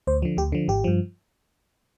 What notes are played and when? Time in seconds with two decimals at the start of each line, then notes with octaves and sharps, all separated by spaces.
0.07 D2 C5
0.22 D3 F3
0.37 D2 G4
0.52 D3 F3
0.68 G#1 G4
0.84 G2 F3